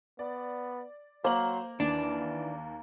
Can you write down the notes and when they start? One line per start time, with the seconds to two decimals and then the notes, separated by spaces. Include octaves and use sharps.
0.19 B3 D5
1.24 F#3 A#3 C5 F#7
1.80 D#2 E3 D4